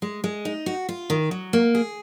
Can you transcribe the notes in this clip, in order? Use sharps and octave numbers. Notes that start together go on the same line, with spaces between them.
G#3
G#3
D#4
F#4
F4
D#3
F#3
A#3
G#4